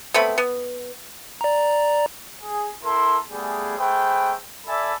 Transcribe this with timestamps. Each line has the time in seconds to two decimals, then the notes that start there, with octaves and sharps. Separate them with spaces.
0.14 A3 B3 C4 B5
0.38 B3
1.41 D5 A#5
2.41 G#4
2.83 E4 A4 A#4 C6
3.30 G3 A3 B3 G#4
3.77 A3 G#4 B4 C5 G5
4.65 A4 D5 E5 G#5 A5 B5